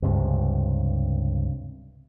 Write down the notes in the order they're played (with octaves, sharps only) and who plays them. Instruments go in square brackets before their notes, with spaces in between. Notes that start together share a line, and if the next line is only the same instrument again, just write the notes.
[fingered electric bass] C#2 G2 C3